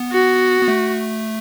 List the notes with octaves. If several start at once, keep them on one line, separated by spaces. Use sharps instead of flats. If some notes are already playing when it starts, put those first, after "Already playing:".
Already playing: B3
F#4
B3
A3